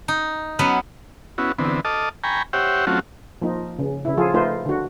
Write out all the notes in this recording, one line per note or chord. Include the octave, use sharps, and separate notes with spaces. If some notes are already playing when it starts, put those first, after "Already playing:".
D#4
F#3 B3 C#4 B4
B3 C#4 E4 F#4
D3 E3 B3 C4
A4 D#5 A5 D6 D#6 F6
G5 G#5 A#5 B5 C#6
G4 C5 C#5 E5 F#5 G5
F#3 A3 C4 C#4 F4 F#4
F3 A#3 D#4
C#3
C#3 E4
F3 F4 G#4 A4
A3 D#4 F4 B4 C5
D3 F#4